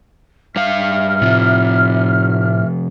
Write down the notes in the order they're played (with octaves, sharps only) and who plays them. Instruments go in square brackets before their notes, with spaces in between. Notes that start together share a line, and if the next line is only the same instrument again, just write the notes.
[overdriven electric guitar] G2 F5 [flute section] E5 F6
[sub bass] A2 [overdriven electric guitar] C3 F3